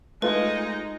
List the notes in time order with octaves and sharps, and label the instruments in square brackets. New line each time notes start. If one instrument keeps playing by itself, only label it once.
[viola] G#3 D#4 [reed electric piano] A3 F4 [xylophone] B4